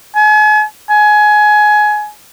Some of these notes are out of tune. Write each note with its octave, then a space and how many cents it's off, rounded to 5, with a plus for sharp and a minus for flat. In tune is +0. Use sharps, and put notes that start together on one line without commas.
G#5 +40
G#5 +20